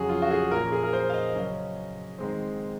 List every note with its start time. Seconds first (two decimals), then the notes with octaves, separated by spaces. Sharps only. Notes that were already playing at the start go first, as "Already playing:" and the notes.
Already playing: F2 C#3 F#3 C#4 F#4 G#4
0.09 F4
0.22 F#4
0.31 G#4
0.51 A#2 F3 A#3 C#4 A#4
0.72 G#4
0.83 A#4
0.93 C5
1.09 F5
1.14 D#5
1.35 C#3 F#3 C#4
2.18 G#2 D#3 G#3 C4